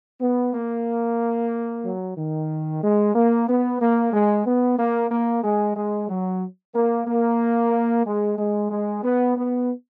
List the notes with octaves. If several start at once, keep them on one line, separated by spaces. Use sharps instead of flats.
B3
A#3
F#3
D#3
G#3
A#3
B3
A#3
G#3
B3
A#3
A#3
G#3
G#3
F#3
A#3
A#3
G#3
G#3
G#3
B3
B3